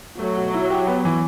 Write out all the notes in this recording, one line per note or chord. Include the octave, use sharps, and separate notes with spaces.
F#3 A3
B2
E4
G4
B3
E3